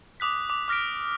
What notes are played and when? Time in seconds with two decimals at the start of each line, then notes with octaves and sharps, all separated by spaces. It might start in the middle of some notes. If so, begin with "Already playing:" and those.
0.20 D6 D#6 F#6 B6
0.50 D6
0.68 D6 F6 A#6 B6 D7